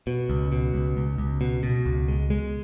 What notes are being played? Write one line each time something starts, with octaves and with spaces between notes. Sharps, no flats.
B2
C#2
B2
C#2
C#2
C#2
B2
B2
C#2
G#3
G#3